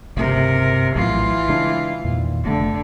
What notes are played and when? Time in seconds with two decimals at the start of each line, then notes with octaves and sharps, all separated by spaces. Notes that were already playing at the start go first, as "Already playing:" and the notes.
0.17 G1 C#2 C3 A#4
0.96 A#1 A2 E3 F#3 F4
1.49 C#3 G#3 D4
2.04 E2 A#2 D#3
2.44 F1 D3 A3